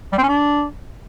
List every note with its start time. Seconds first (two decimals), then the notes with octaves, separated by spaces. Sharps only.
0.12 G3
0.18 C4
0.23 C#4
0.29 D4